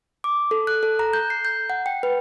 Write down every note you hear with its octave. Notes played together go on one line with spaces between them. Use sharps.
D6
A4
F#6
A4
A#5
G6
C7
G6
F#5
G5
B4